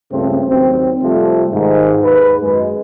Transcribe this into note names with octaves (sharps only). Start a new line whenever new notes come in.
C#2 G2 C#3 A3 C4
D#2 F#3 C4
C3 F3 G3 A3 F4
G#2 D#3
D#2 G#2 G#4 B4
F#2 G#3